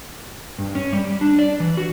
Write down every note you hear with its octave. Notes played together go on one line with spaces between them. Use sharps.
G2
C#4
G3
D4
D5
E3
F#4